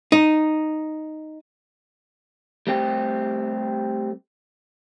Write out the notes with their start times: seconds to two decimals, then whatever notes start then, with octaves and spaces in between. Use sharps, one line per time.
0.12 D#4
2.67 G3 A3 C4 G4